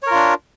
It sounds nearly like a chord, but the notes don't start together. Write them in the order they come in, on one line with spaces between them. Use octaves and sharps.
C#5 A#4 F4 D4